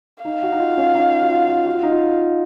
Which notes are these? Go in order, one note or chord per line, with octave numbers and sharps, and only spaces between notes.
D#4 F5
F#4
D#4
F4
C#4
D#4
F#4
F4
F4
F#4
F4
D#4
F4